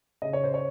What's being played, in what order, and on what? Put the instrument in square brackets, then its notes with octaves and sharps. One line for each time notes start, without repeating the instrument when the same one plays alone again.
[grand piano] C#3 D#5
C#5
C5
C#5